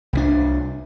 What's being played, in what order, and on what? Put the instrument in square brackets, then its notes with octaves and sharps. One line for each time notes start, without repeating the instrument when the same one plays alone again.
[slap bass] C2 E3 D4